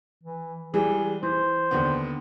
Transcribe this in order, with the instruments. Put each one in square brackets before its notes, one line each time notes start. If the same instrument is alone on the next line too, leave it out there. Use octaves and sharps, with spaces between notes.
[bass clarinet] E3
[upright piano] E3 G3 G#3 [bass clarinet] G#4
[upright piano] E3 [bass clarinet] C5
[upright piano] D#2 D3 B3